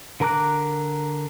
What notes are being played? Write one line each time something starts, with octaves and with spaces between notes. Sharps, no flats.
D3 A#4 A#5 D6 F#6